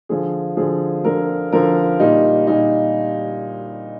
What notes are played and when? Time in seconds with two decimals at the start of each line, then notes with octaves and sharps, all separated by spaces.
0.09 D3 F3 G#4
0.57 D3 F3 G#4
1.05 D3 F3 A#4
1.52 D3 F3 A#4
2.00 A#2 G3 D#4
2.47 A#2 G3 D#4